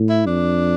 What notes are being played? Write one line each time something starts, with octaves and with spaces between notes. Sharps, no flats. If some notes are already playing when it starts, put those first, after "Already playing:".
Already playing: A2
E4
F2 D4